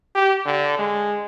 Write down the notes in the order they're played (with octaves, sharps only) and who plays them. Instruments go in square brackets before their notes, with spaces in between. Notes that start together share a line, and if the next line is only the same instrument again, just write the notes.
[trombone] G4
D3
G#3